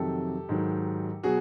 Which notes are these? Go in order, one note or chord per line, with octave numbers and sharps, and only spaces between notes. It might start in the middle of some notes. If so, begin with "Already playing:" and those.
Already playing: F2 C3 D#3 F#3 G4 A4
G#2 D#3 F#3
B2 F#3 F#4 G#4